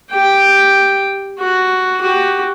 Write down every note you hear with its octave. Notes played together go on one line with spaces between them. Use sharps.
G4 G5
F#4
F#4 G4